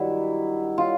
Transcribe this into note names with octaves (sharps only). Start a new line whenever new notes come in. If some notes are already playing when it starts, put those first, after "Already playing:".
Already playing: G2 D#3 F#3 E4
F4